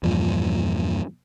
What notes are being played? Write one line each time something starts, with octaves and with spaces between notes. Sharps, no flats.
E2 G2 A#2 F3